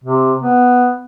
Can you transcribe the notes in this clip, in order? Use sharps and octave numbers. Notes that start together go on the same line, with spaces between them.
C3
B3